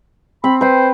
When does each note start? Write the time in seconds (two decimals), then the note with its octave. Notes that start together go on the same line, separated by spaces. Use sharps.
0.44 C4 B5
0.61 B4 C5 G5